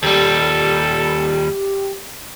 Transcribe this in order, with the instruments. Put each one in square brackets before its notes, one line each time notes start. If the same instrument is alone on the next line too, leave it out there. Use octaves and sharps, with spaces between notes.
[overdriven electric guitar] D#2 G3 [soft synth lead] G4 [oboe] A4